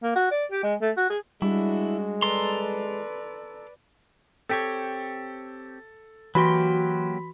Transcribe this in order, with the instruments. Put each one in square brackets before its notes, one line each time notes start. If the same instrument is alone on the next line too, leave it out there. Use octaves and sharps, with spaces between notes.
[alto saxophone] A#3
F#4
D5
G4
G#3
A3
F#4
G#4
[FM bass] G3 [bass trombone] G#3 [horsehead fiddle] D4 F#4 [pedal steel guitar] E4
[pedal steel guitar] A4 A#5 C6 [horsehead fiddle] B4 D5
[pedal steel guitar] C4 G4 C#5 [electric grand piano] A4
[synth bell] E3 F#4 C6 [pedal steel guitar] F#3 A#3 G4 [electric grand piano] B5